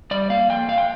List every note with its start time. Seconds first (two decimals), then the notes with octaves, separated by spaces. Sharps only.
0.11 G3 D5
0.30 A#3 F5
0.49 F2 G5
0.68 A#2 F5
0.78 G5